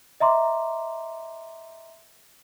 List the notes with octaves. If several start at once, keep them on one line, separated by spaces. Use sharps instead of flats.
D#5 E5 A#5 C6 D6